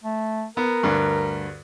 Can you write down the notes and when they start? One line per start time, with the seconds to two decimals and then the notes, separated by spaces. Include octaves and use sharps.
0.04 A3
0.57 B3 A#4
0.83 D2 G2